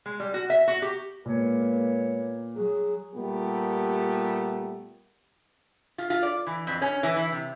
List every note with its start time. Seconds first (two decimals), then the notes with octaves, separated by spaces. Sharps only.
0.06 G#3
0.20 G3
0.34 F#4
0.50 E5
0.67 F#4
0.82 G4
1.26 A#2 G#3 A#3 B3 C#5
2.56 F#3 G#4
3.15 A#2 G3 A3 B3 G4 A#4
5.98 F4
6.10 F4
6.23 D5
6.47 E3
6.67 F2
6.82 C#4
7.03 E3
7.16 E3
7.32 C3